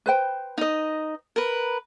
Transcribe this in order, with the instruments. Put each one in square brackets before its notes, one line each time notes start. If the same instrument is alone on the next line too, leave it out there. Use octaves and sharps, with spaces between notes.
[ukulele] B4 C5 G5
[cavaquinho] D#4 D#5
A#4 B4